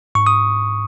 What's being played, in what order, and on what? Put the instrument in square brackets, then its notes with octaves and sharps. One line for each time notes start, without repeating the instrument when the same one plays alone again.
[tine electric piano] G#2 C#6
D#6